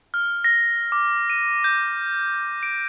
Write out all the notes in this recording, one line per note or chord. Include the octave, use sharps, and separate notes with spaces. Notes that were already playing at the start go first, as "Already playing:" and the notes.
F6
A#6
D6
D#7
G6
D7